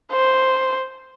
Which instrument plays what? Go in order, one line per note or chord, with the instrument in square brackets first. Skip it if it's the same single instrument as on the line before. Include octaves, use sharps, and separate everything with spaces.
[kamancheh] C5